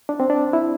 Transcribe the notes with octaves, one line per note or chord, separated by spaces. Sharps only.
D4
C4
D4
E4